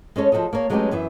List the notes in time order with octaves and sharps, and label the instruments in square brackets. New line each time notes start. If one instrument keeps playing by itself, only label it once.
[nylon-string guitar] G#3 C#4 A4 C#5
F3 G3 F#4 A4 D#5
A#3 A#4 C#5
F#3 G#3 A3 B3 C#4 G4
F#2 E3 B3 E5